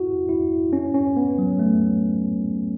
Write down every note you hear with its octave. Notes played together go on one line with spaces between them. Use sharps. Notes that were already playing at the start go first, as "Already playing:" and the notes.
Already playing: E4 F#4
E4
C#4
C#4
B3
F#3
A3